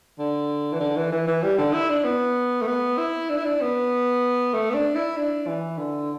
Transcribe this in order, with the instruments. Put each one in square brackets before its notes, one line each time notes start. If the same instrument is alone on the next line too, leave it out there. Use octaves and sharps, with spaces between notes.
[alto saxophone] D3
E3
D3
E3
E3
E3
G3
D3
E4
D4
B3
A3
B3
E4
D4
E4
D4
B3
A3
B3
D4
E4
D4
E3
D3